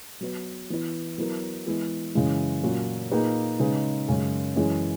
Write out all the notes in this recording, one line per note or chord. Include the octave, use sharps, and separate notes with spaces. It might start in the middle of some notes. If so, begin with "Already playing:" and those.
F#3 B3 F#4 B4
E3 B3 E4 B4
F#3 B3 E4 A#4
E3 G#3 B3 E4 G#4
F#2 C#3 E3 G#3
A#2 F#3 A#3 C#4 F#4
A#2 A#3 D#4 G#4 B4
C#3 G#3 D#4 G#4 B4
F#2 C#3 G#3 C#4
F#2 E3 G#3 C#4 G#4